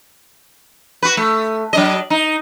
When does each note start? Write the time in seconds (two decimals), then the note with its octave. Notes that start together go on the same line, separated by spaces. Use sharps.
1.02 F#4 B4
1.17 A3
1.73 F#3 D4 D#5
2.10 D#4